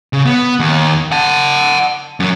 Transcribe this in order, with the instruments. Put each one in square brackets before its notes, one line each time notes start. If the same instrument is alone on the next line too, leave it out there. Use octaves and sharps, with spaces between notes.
[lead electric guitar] C#3
B3
D#2
F#5 A5
F#2 F#3